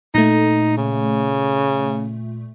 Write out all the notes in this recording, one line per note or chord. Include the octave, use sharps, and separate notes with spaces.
A#2 A3 D#4
C#3